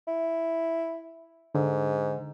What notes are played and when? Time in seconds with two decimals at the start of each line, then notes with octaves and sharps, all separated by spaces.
0.07 E4
1.55 G#2 D3